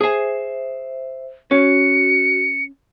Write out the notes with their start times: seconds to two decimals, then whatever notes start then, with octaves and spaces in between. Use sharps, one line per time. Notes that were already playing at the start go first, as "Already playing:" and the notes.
0.01 G#4 C5 E5 G#5
1.51 C#4 F#4 C#7